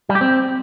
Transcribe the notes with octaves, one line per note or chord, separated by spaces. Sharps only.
G3
G4
C4